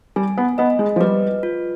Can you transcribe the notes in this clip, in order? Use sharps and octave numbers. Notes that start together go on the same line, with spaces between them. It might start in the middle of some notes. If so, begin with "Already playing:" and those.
G3 G#5
B3
B3 D#5
G#3
F3
G3 B4
F4